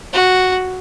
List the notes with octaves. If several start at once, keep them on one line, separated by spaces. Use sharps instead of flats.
F#4